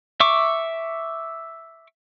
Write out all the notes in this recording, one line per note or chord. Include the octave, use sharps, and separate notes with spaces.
E5 C#6 D6